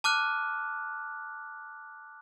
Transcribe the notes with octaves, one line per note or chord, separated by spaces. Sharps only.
A5 D6 F6 F#6